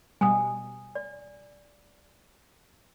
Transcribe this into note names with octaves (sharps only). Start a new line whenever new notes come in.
B2 G3 G#5 D#6
D5